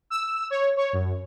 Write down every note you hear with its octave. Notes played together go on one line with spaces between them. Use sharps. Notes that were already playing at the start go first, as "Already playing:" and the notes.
E6
C#5
C#5
F#2